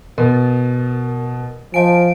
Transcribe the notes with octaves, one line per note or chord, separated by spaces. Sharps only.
B2 A#4
F3 D#5 F5 G#5 A5 D7